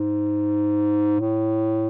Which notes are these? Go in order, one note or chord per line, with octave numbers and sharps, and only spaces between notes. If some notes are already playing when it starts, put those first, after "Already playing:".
Already playing: G#2
A2